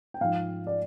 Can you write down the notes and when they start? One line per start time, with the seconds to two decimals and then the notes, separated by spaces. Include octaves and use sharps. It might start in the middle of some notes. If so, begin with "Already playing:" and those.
0.14 G5
0.21 G#2 F3 F5
0.67 D5